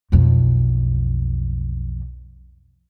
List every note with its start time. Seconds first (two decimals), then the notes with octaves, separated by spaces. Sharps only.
0.12 B1 F2